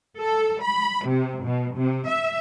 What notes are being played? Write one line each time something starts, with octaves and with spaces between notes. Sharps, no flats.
A4
B5
C3
B2
C3
E5